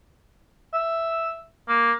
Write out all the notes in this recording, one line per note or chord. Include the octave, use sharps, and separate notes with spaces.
E5
A#3